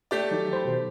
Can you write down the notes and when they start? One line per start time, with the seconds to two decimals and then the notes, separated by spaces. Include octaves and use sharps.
0.11 A3 G4 D5
0.31 D#3 F#3 D#4
0.53 C5 B5
0.65 B2 D#3 C5